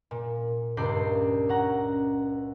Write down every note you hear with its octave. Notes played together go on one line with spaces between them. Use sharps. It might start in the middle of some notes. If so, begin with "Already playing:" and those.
A#2
C#2 G2 A#4 D5 G6 C7
C#4 F#5 A#5